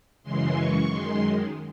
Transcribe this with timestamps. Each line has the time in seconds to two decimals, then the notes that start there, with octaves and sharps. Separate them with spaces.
0.23 F#2 C#3 E3 G#3 C6
0.56 C#6
0.89 F#2 D#3 G#3 C6